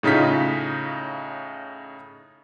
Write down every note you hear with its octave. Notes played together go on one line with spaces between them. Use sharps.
A2 C#3 D#4 F4 B6